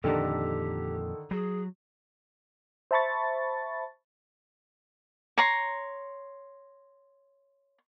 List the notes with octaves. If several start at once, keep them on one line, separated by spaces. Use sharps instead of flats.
F2 A#2 D3 D#3 G4 A4
F#3 G#4
C5 E5 A5 B5 C#6 A6
C#5 A#5 C6